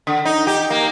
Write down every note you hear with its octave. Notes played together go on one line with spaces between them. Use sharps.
D3
D#4
G4
A#3